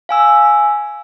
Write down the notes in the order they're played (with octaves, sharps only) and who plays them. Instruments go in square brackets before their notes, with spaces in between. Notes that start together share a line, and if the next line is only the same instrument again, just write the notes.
[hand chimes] F5 G#5 E6